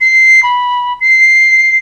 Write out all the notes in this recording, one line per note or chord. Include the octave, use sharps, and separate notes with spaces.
C7
B5
C7